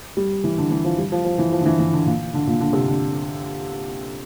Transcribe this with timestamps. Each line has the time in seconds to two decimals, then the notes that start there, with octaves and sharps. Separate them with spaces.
0.17 G3
0.44 E3
0.58 D3
0.71 E3
0.85 F3
0.98 G3
1.12 F3
1.25 F3
1.38 E3
1.52 F3
1.61 D3
1.66 E3
1.79 E3
1.93 D3
2.06 A#2
2.34 D3
2.47 A#2
2.61 D3
2.73 C3
2.87 D3